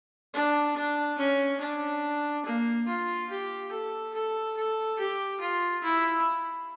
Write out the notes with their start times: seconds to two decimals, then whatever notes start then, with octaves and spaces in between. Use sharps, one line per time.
0.34 D4
0.76 D4
1.18 C#4
1.61 D4
2.46 A#3
2.87 F4
3.30 G4
3.72 A4
4.14 A4
4.57 A4
4.99 G4
5.41 F4
5.84 E4